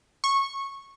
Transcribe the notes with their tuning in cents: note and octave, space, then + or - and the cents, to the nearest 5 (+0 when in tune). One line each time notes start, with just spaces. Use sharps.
C#6 -15